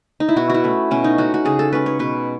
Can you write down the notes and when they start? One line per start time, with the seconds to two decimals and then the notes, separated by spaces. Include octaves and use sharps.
0.20 D#4
0.29 E4
0.36 B2 F#4
0.50 E4 F#4
0.64 A3 C#4
0.91 B2 C#4
1.04 D#4
1.18 A3 C#4 F#4
1.34 F#4
1.45 C#3 G#4
1.59 A4
1.72 G#3 C#4 B4
1.86 C#5
1.99 B2 B4